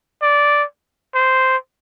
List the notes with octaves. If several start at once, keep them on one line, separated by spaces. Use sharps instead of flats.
D5
C5